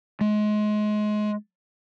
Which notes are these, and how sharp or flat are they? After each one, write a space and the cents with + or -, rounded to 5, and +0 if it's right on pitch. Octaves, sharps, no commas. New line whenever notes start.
G#3 +25